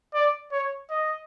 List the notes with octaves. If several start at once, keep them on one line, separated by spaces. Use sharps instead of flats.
D5
C#5
D#5